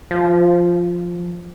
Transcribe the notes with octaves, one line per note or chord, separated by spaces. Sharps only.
F3